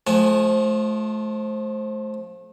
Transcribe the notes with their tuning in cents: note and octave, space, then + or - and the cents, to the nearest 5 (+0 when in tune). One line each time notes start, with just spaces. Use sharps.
F3 +15 A3 -30 G#5 +0